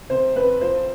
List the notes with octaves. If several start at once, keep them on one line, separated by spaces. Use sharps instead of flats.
C3 C5
F2 B4
F3 C5